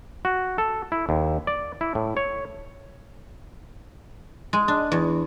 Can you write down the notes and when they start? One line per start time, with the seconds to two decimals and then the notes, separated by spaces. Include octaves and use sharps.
0.25 F#4
0.58 A4
0.92 E4
1.09 D#2
1.47 D5
1.81 E4
1.95 A2
2.17 C#5
4.53 G#3
4.68 D4
4.92 E2